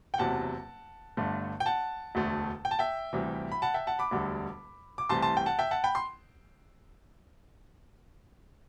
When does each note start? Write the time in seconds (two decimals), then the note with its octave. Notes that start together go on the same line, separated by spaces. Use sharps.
0.14 G5
0.18 F#1 E2 C3 F#3 F#5 A5
1.17 G1 G2 D3 A3
1.60 G5
1.66 F#5 A5
2.15 E1 D2 D3 A3
2.65 G5
2.71 A5
2.79 E5 G5
3.13 D2 C3 E3 G3
3.52 B5
3.62 F#5 A5
3.74 E5 G5
3.87 F#5 A5
3.99 B5 D6
4.11 E1 D2 D3 G3
4.98 D6
5.09 C2 C3 E3 A3 A5 C6
5.22 A5 C6
5.37 G5
5.46 F#5 A5
5.59 E5 G5
5.71 F#5 A5
5.84 G5 B5
5.95 C6